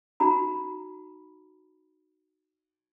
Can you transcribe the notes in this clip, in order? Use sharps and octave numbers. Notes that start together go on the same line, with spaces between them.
D#4 F#4 A#5 B5